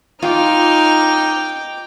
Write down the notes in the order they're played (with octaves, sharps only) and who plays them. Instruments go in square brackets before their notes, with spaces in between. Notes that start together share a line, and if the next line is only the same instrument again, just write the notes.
[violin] D#4 F6 [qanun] F4 [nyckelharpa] G5 D6